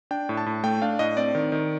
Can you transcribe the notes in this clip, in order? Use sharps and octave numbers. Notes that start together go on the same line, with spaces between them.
D4 G5
A2
A5
A2
A3 G5
D4 F5
A2 D#5
C4 D5
D#3
D#3